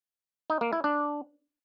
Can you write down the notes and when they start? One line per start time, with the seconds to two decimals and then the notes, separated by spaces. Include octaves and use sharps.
0.50 D#4
0.61 A#3
0.73 E4
0.84 D4